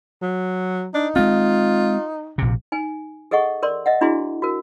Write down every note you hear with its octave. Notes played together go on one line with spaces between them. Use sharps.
F#3
D4 D#4
G#3 C4 F4
A#1 C3
D#4 G#5
G#4 A4 D#5 F#5 C#6
A#4 D5 C6
D#5 E5 F#5
D4 E4 F#4 G#4 C6
F#4 A#4